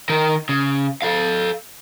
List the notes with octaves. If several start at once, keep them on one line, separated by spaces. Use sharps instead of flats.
D#3 A#4
C#3
A4 F5